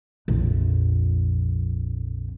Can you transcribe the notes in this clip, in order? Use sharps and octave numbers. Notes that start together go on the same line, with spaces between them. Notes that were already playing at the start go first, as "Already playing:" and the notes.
A#1 F2